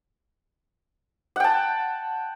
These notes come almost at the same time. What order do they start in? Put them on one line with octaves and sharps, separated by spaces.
F#5 G5 A5